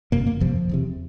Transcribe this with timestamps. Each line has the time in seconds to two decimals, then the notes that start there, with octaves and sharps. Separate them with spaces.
0.12 G1 F2 C3 A#3
0.26 A#3
0.40 G1 F2 C3 F3
0.69 E1 E2 C3